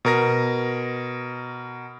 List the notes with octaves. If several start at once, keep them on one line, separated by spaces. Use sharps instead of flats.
B2 A#4 A#6